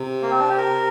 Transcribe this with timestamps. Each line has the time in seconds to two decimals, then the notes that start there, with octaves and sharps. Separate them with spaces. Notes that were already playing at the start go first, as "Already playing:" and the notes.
Already playing: C3
0.22 A#3
0.31 C4
0.40 D4
0.49 G4
0.57 A#4